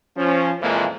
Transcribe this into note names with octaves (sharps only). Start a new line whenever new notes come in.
F3 C#4
F2 A#2 E3 F3 G#3 A#3